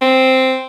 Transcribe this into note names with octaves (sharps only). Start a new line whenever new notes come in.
C4